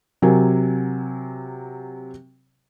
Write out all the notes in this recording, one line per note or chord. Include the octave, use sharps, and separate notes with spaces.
C3 F#3 A#4 G#5